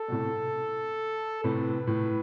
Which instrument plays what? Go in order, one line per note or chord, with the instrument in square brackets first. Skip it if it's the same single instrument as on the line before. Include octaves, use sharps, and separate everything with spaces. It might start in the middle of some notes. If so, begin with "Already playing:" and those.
Already playing: [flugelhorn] A4
[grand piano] B2
A2 C3
[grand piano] A2 C3 [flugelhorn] B4
[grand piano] A2